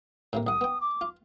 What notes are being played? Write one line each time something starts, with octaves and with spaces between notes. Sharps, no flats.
A2 C3 A#3
C2 F#5 D#6
B3 G5
D6
F4